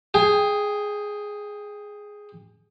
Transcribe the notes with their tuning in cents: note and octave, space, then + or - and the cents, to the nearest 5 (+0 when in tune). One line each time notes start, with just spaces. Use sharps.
G#4 +0 G5 +25